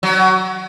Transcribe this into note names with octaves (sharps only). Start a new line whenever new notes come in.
F#3